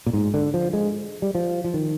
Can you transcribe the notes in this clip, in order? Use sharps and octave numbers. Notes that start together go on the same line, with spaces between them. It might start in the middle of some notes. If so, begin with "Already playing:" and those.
A#2
G#2
D3
F3
G#3
G3
F3
F3
D#3